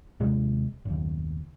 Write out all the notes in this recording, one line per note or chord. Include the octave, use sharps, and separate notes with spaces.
D#2 C3 G#3
F#1 D#2